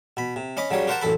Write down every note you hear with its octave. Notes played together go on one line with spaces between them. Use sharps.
B2 B5
C3
C#4 D#5 B5 D6
C#3 F#3 G3 C#5
G4 A#4 C5 F#5 G5 A5
A1 F#2 A4 B5